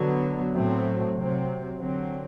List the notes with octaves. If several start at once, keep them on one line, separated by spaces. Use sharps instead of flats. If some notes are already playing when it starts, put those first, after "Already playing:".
Already playing: D3 F#3 B3
A2 F#3 A3 C4
C3 F#3 C4
D3 F#3 C4